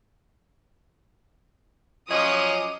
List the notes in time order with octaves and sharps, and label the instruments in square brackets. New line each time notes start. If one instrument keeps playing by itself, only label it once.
[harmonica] F3 F#3 C#4 [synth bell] D#5 D6 [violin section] D#6